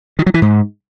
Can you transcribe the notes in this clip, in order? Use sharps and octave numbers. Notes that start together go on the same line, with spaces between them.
D#3
F#3
E3
G#2